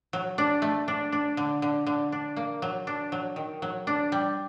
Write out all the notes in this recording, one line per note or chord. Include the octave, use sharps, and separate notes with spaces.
F#3
D4
A3
D4
D4
D3
D3
D3
D4
A#3
F#3
D4
F#3
D#3
F#3
D4
G3